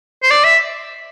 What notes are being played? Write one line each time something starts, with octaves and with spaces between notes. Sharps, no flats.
C5
D5
E5